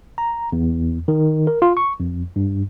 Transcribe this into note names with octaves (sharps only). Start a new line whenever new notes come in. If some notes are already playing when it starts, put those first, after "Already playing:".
A#5
E2
D#3
A#4
F4
C#6
F2
G2